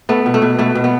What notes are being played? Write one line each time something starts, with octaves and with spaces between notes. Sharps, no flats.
A3 B3
B2
A3
B2
B2 A3
B2
B3